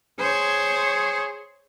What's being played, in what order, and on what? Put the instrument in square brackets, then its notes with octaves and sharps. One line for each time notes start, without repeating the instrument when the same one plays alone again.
[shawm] G#4 [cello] C5 C#5